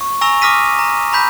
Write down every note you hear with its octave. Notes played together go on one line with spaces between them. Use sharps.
C#6
G#5 A#5 C#6 E6 A#6 F7
D6 D#6 F6 A#6 B6 D#7
A#5
A#5 B5 G6 B6